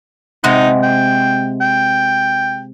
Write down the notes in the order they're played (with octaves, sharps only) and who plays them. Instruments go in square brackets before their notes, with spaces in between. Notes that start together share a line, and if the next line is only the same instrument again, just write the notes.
[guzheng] C3 G#3 F#5 [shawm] D#4
[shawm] G5
G5